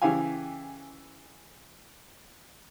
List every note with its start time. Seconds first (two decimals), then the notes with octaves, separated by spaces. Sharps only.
0.02 C#3 E3 E4 G4 F5 G#5